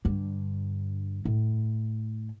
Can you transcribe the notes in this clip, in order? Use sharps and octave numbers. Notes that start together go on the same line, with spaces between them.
G2 D3
A2